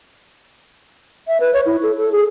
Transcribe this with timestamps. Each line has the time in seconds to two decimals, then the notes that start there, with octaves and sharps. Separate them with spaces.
1.28 E5
1.40 B4
1.53 C#5
1.66 E4
1.83 A4
1.97 A4
2.12 G#4